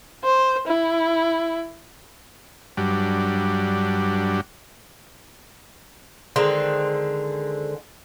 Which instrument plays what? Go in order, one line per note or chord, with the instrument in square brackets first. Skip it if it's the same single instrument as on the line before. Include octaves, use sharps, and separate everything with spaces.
[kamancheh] C5
E4
[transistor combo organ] G2 F#3 G3 D4
[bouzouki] D3 D#3 G#3 C4